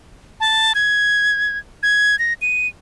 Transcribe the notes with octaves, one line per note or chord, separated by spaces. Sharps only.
A5
G#6
G#6
A#6
D#7